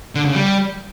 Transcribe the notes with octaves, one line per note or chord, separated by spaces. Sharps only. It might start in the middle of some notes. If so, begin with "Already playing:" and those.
D3
C#3
G3